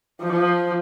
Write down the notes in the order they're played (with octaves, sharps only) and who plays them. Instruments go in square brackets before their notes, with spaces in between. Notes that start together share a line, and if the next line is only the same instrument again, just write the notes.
[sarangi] F3